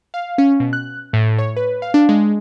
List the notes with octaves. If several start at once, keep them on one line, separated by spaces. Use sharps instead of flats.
F5
C#4
B2
F#6
A2
C#5
B4
F5
D4
G#3